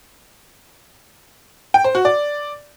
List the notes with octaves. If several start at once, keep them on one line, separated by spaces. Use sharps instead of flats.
G5
C5
F#4
D5